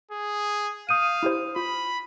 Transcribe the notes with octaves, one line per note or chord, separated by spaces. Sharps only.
G#4
F5 D#6 G6 D#7
E4 G4 C5
F4 B5